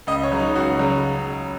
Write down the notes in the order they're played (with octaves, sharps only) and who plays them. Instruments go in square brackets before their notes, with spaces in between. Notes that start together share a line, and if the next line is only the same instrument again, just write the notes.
[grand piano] C#2 D#5
C#5
C#3 F#3
D#4
C#2 F#4
C#3 F#3